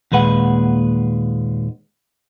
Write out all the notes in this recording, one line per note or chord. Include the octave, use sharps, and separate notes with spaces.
D#2 A#2 G#3 B4 F#5